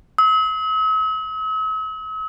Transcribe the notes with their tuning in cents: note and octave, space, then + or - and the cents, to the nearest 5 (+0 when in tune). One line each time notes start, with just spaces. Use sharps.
E6 -45